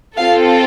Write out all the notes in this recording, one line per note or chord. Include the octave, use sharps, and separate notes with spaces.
C4 F4 A4 F5